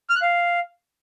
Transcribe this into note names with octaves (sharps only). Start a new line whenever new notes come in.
F6
F#6
F5